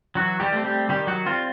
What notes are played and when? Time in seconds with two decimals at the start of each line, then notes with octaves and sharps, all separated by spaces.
0.15 E3 F#3 F#4
0.40 G3 G4
0.53 A3 C4
0.64 G3 G4
0.89 D#3 G3 G4
1.07 F#3 F#4
1.26 G3 C4 F4